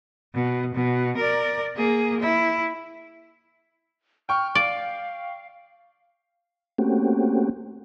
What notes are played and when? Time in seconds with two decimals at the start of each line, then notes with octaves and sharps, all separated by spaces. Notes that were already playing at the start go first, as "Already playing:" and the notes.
0.34 B2
0.74 B2
1.17 A#4 D5
1.76 A#3 G#4
2.20 E4
4.29 G5 C#6 F6
4.55 D5 F5
6.78 A3 A#3 C4 C#4 F#4 G4